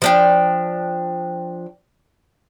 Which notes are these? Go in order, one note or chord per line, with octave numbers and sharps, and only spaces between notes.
F3 D4 G5